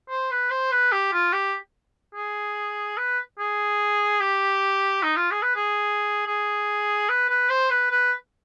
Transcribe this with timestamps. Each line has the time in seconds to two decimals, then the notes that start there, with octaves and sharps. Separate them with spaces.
0.09 C5
0.31 B4
0.50 C5
0.71 B4
0.92 G4
1.13 F4
1.33 G4
2.15 G#4
2.97 B4
3.39 G#4
4.20 G4
5.03 D#4
5.16 F4
5.31 G#4
5.43 B4
5.56 G#4
6.27 G#4
7.09 B4
7.29 B4
7.49 C5
7.70 B4
7.91 B4